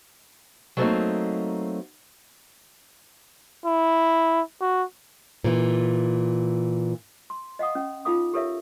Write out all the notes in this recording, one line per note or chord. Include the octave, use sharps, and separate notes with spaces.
F#3 G3 A3 A#3 C4 D#4
E4
F#4
A#2 E3
C6
D#5 F5 F#5 D#6
C#4
D#4 F4 A4 F5 D6 D#6
G4 A4 A#4 C#5 E5 F5